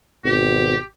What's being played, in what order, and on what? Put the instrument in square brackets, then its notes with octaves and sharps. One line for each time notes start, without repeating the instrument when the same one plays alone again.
[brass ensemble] G#1 B2 [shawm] G4